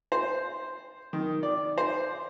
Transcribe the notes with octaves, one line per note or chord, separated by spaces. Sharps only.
C5
D#3
D5
C5